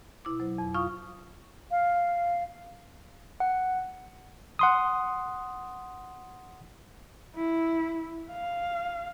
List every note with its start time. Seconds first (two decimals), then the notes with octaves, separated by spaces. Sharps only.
0.25 B2 E4 D6
0.40 F#3 C5
0.58 F2
0.74 F4 F5 C#6 D#6
1.71 F5
3.40 F#5
4.59 F#5 C6 D#6
7.35 E4
8.31 F5